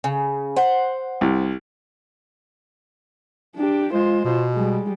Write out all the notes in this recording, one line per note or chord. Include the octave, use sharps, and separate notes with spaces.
C#3
C5 F#5
C2
D4 G4
G#3 F4 C5
B2
G3 G#3